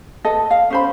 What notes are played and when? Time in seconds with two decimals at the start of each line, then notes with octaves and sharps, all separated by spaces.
0.24 A4 B4 D#5
0.51 F5
0.70 C#4 C5 B5